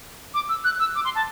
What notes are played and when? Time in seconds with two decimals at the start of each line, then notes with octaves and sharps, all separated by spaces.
0.34 D6
0.49 E6
0.64 F#6
0.80 E6
0.95 D6
1.05 C6
1.15 A5